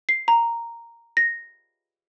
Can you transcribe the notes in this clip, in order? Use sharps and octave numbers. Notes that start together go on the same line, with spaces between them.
C7
A#5
A#6